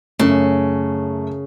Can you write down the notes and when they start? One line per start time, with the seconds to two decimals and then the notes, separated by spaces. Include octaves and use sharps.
0.19 F#2 C#3 A3